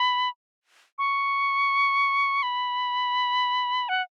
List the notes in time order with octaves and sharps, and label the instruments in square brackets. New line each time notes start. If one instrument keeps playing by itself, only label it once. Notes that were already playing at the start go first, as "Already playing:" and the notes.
Already playing: [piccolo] B5
C#6
B5
F#5